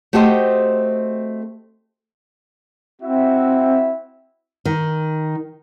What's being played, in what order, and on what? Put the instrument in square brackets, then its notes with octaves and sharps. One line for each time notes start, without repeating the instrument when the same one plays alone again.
[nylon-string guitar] A3 C4 F#4 G4 C5 D#5
[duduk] C4 [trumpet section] E4 F#4 E5
[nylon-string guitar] D#3